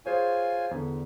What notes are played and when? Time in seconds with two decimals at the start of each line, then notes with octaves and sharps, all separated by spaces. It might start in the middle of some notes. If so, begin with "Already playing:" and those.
0.06 F4 G#4 C5 C#5 G#5
0.71 E2 D3